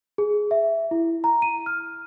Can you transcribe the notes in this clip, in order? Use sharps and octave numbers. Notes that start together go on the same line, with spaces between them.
G#4
E5
E4
A#5
D#7
F6